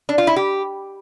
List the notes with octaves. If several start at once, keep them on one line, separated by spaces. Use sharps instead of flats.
D4
F4
E4
G4